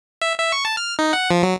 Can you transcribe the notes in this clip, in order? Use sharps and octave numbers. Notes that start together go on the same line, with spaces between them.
E5
E5
C#6
A5
F6
D#4
F#5
F3
F#3